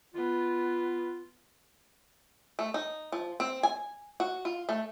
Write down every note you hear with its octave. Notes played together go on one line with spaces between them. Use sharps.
B3 F4
A3
D#4
F3
C4
G#5
F#4
F4
A3